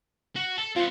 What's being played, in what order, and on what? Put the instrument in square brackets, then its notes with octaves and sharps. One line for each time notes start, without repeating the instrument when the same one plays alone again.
[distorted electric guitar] F#4
A4
[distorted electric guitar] C4 F#5 [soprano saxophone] F4